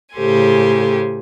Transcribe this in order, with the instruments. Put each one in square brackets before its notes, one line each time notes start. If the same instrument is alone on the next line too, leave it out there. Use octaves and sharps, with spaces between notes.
[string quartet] A2 C#3 G4 A4 C5 G#5